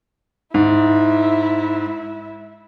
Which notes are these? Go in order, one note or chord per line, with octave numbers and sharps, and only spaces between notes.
G#2 E4